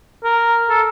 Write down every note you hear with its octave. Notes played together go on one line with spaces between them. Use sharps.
A#4
A4